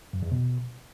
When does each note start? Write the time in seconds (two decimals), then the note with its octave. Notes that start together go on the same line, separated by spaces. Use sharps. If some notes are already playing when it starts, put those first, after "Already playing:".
0.13 F#2
0.23 E2
0.32 B2